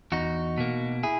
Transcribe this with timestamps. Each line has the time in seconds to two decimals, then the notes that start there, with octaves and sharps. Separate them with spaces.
0.12 E2 D#4 F#4
0.58 B2 A#3
1.03 E4 G#4